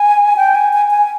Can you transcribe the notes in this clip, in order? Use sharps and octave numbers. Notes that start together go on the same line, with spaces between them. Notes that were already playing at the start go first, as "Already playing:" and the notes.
Already playing: G#5
G5
G#5
G#5
G#5